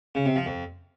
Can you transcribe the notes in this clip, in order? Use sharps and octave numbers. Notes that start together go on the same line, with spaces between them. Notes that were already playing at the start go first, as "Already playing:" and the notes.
C#3
C3
F3
F2